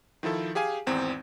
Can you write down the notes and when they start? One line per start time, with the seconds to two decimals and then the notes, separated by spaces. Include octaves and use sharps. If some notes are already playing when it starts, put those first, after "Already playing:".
0.23 D#3 F3 E4 A4
0.55 G4 G#4 F5 G#5
0.87 G#1 E2 C4